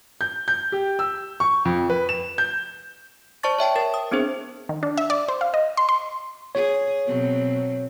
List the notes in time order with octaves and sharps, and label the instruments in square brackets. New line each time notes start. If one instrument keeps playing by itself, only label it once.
[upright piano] G6
G6
G4
E6
C#6
F2
B4
E7
G6
[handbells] C5 D5 A5 C#6 A6
C#5 E5 G5 A5
A#4 A6
D#6
B3 C4 D4 G#4 C5
[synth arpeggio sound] D#3
D4
E5
D5
C5
F5
D#5
C6
C6
[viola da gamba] G#4 [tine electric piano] C#5
[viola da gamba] B2 F#3 C4